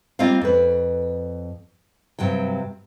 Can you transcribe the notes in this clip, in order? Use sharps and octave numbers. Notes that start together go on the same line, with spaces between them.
G3 A#3 C4 F4 D#5 F5
F2 B4
G2 C3 F#3 G5